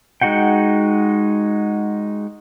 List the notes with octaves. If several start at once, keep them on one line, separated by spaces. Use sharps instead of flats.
G#3 D#4 F#4 F#5 G5